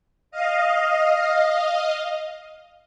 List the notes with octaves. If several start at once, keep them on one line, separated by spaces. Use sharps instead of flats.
D#5 F5